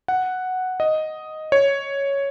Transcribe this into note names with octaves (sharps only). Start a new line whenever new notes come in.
F#5
D#5
C#5